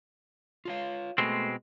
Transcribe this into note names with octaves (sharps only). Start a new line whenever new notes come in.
F4 C#5 F5
B2 G#3 A3 C4